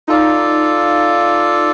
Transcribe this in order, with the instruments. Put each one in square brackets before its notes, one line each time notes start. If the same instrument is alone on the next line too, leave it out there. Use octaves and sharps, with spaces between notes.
[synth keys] D#4 [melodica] F4 A4 D5 F5